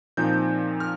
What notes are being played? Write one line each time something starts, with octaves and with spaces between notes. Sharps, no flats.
A#2 F3 C4 D#4 G6
F6